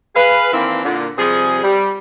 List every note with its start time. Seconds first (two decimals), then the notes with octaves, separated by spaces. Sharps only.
0.15 G#4 B4 F5
0.52 D#3 E3 A#3 C4 D4 E4
0.83 A#2 D3
1.17 C3 F3 G3 G#4
1.62 G3